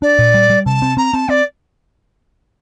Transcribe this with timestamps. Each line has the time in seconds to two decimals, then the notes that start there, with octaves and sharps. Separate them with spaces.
0.02 D4 D5
0.19 A#2
0.34 G3
0.50 G3
0.66 C3 A5
0.82 C4
0.97 C4 A#5
1.13 C4 A5
1.29 C4 D5